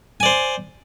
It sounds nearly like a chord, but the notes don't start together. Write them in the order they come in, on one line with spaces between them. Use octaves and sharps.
G#5 D5 C5